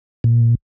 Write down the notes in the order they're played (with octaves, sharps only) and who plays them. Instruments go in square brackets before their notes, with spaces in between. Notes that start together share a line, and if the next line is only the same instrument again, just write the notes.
[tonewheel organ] A#2